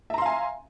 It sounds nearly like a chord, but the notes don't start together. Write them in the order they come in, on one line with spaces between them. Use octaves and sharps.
E5 A#5 C6 F5 G#5